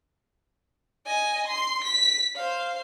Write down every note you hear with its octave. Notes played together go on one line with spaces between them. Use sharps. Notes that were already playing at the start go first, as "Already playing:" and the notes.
D#5 G#5
C6
B6
C5 F5